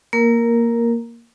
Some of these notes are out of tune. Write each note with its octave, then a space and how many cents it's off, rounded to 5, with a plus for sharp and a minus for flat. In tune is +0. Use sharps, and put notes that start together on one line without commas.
A#3 +0 A#4 +0